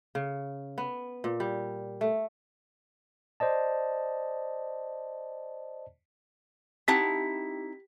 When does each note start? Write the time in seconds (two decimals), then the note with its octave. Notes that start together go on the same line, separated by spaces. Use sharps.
0.15 C#3
0.78 B3
1.24 A#2
1.40 G3
2.01 A3
3.40 C5 D5 D#5 A5
6.88 C4 D#4 E4 G4 F#5 A5 B6